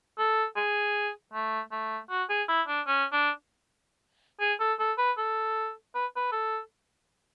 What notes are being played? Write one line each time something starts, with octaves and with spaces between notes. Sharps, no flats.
A4
G#4
A3
A3
F#4
G#4
E4
D4
C#4
D4
G#4
A4
A4
B4
A4
B4
B4
A4